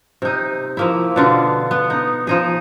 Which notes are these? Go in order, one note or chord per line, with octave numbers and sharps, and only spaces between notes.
C3 D#4
F3 A#3 E4
B2 D3 F4
B3
D#4
F3 D#4 G#4